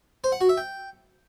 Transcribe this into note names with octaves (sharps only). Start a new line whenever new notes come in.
C5
F#5
F#4
E5
G5